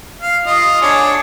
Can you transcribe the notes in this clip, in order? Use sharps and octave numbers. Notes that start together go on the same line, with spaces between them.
F5
F4 D#5
D4 G#4 C#5